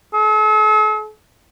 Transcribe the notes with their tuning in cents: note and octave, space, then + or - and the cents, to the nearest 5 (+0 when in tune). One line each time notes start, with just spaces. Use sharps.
A4 -45